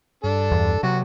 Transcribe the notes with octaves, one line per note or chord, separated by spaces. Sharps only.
G2 D4 A4
E2
C3 F#3 F#4